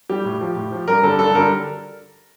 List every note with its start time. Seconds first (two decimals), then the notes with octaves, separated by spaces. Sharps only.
0.09 G3 G4
0.25 A2
0.41 F3
0.56 A2
0.72 F3
0.88 G2 A#4
1.03 D3 G3 A4
1.19 G2 A4
1.35 D3 G3 A#4